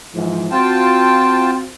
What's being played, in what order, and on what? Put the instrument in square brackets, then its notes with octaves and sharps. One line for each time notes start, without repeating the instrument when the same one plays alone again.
[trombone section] G#2 E3 F3
[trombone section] C4 F#4 [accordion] F4 G5 A5